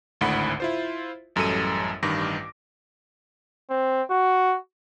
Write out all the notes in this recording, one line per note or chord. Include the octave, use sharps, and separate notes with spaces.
G#1 D2 A2 D3 F#5 B5
E4 F4 C5
A1 F#2 G3 A4 C#7 D#7
A1 G2 D#3 D6 A#6
C4
F#4